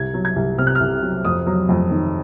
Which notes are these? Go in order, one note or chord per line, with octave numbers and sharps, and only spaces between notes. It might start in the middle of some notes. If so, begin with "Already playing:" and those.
Already playing: C2 G#6
F#3
G#6
C2
C3 F6
F#6
C2 F6
F#3
F2 D#6
F#3
F2
D#3